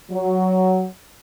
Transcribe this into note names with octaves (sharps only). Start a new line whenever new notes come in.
F#3